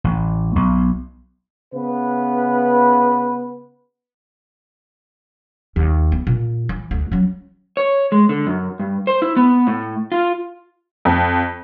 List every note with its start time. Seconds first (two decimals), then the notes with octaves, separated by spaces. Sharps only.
0.04 A1
0.56 B1
1.74 C#3 B3 B4
5.76 D#2
6.12 B3
6.27 A#2
6.69 E3
6.91 D2
7.12 F#3 C#4
7.77 C#5
8.12 G#3
8.29 D3
8.47 F#2
8.79 G2
9.07 C5
9.22 E4
9.36 B3
9.67 A2
10.12 F4
11.05 F2